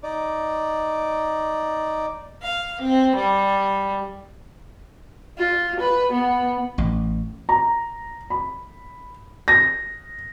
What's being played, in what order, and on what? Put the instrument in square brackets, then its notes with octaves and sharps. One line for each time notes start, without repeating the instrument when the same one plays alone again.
[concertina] D#4 D5
[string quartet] F5
C4
G3
[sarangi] F4
B4
B3
[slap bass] A1
[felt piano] A#5
B5
A#6